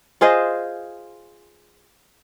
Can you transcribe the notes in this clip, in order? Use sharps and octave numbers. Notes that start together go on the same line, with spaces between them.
F4 G#4 C5 D#5